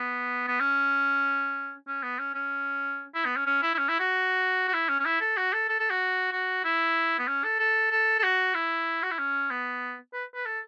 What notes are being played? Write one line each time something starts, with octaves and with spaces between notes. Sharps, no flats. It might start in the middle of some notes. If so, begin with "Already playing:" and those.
Already playing: B3
B3
C#4
C#4
B3
C#4
C#4
E4
B3
C#4
C#4
E4
E4
C#4
E4
F#4
F#4
E4
C#4
C#4
E4
A4
F#4
A4
A4
A4
F#4
F#4
E4
B3
C#4
A4
A4
A4
A4
F#4
E4
F#4
E4
C#4
B3
B4
B4
A4